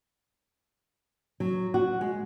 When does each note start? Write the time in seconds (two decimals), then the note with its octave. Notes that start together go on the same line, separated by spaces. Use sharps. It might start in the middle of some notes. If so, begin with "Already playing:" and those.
1.40 F#3
1.74 F#4
2.01 G#3